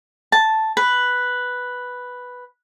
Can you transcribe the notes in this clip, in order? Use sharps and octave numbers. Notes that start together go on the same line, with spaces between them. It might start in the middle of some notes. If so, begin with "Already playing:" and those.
A5
B4